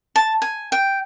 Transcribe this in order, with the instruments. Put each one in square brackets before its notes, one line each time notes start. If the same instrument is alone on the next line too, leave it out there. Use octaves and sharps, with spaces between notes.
[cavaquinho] A5
G#5
G5